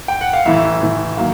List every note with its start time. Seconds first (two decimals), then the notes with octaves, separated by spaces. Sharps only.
0.08 G5
0.21 F#5
0.33 F5
0.45 A1 A2 E3 E5
0.81 A1 A2 E3
1.17 D#3 F#3 A#3 F5